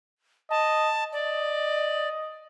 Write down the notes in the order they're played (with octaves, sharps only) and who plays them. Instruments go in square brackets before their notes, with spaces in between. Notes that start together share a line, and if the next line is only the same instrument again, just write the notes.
[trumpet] D#5 [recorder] A5
[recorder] D5 [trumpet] D#5